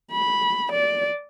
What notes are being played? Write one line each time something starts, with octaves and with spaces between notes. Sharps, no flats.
B5
D5